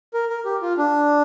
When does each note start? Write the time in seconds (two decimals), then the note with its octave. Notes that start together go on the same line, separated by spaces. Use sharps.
0.14 A#4
0.29 A#4
0.45 G4
0.62 F4
0.78 D4